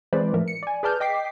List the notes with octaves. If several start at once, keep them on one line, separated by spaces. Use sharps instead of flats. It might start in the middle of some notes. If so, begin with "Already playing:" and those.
E3 G#3 C4 B4 C5 D5
A2 F3 A#4 E5
C#7
D5 G#5
G#4 B4 D5 A5 F6 G6
D#5 G5 D6 B6 C7